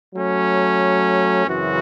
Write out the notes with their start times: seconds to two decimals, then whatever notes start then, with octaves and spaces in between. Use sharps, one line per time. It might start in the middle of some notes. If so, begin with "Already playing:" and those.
0.14 F#3 A3 C#4
1.47 F#2 C#3 E3 C4 F#4